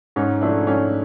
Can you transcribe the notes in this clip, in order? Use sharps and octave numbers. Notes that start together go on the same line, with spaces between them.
G#2 C#4 D#4
F3 A3 D4 E4
G#2 C#4 D#4